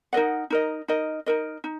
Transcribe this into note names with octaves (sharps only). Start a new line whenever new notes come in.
D#4 A#4 D#5 F#5
D#4 A#4 D#5
D#4 A#4 D#5
D#4 A#4 D#5
D#4